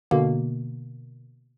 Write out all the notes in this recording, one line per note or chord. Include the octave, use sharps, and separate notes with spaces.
B2 D3 A#3